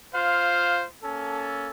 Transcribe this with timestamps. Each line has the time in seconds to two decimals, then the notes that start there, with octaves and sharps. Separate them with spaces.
0.14 F4 C5 F5
1.03 A#3 C#4 A4